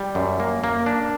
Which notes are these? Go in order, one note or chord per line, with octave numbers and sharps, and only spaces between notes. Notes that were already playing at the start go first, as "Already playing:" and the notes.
Already playing: G3
F#2
A#3
A#3
D4